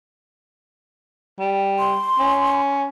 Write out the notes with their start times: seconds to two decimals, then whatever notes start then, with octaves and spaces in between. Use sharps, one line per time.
1.39 G3
1.79 C6
2.19 C#4